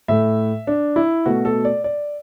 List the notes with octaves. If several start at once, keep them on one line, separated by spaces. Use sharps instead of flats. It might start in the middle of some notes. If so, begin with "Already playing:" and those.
A2 A3 E5
D4
E4
B2 A3 F#4
A4
D5
D5